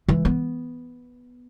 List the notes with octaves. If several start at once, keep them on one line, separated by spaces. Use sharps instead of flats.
E3
B3